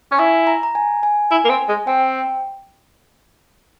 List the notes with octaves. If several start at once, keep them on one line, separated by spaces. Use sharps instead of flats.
C#4
E4 G#5
A#5
A#5
G#5
G#5
E4 G#5
A#3
C4
G#3
C4 G5